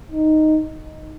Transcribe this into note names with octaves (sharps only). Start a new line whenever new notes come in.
D#4